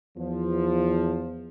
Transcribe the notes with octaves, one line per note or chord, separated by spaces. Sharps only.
E2 F3